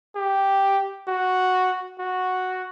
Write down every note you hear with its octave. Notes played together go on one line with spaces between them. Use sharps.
G4
F#4
F#4